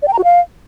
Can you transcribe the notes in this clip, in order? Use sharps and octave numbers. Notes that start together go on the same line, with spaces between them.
D5
G5
A#5
F#4
F5